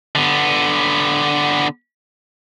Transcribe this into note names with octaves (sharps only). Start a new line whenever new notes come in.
D3 B3